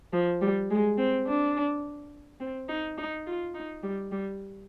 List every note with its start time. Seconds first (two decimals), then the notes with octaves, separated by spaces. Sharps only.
0.13 F3
0.42 G3
0.71 G#3
0.98 C4
1.27 D4
2.41 C4
2.69 D#4
2.98 D#4
3.27 F4
3.55 D#4
3.83 G3
4.12 G3